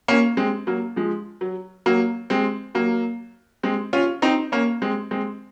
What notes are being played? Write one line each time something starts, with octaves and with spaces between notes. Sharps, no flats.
A#3 C#4
G#3 C4
F#3 A#3
F3 G#3
F#3
F#3 A#3
G#3 C4
F#3 A#3
G#3 C4
C#4 F4
C4 D#4
A#3 C#4
G#3 C4
G#3 C4